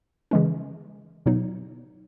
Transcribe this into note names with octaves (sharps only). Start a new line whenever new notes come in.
C#3 E3 G#3 C#4
B2 F#3 B3 D#4